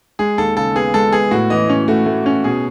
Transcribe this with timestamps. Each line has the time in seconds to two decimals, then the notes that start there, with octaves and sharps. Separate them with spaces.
0.19 G#3 G#4
0.38 D#2 A4
0.57 C#3 A4
0.75 B3 G#4
0.94 G#3 A4
1.12 B3 G#4
1.31 A2 F#4
1.50 E3 D#5
1.69 C#4
1.88 A3 F#4
2.06 A3
2.26 C#4
2.44 B2 G#4